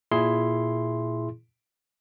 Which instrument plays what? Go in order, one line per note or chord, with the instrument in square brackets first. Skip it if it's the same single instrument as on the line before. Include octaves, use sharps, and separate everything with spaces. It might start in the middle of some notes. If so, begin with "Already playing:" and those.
[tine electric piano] A#2 E4 G#4 C6